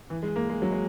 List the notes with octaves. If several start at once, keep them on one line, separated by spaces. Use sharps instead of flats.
E3
G#3
A#3
G#3
F#3
G#3